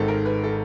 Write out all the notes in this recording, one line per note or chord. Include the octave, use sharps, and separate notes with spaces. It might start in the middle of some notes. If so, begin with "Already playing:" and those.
Already playing: G#1 G#2 D#3 A4
A#4
B4
A4